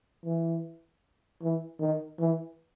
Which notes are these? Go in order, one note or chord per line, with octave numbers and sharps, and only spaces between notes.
E3
E3
D#3
E3